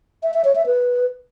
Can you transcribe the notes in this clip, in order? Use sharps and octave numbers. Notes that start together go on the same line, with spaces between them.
E5
E5
C#5
E5
B4